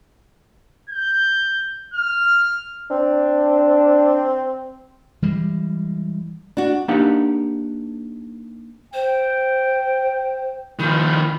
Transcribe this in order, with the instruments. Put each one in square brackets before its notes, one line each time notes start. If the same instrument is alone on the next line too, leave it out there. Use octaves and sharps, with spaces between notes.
[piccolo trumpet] G6
F6
[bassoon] C4 [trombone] D4
[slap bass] E3 G3 G#3
[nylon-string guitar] D4 F#4
[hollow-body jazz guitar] A#3 D4 D#4 G4 F5 F#5
[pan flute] C5 [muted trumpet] G5
[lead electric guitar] D#3 F3 [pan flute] B5